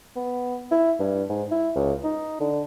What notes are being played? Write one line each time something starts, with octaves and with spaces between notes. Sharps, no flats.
B3
E4
G2
G#2
E4
C#2
D#4
D3